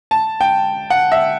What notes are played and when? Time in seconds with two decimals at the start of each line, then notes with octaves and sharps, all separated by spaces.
0.11 A5
0.41 G5
0.90 F#5
1.12 E5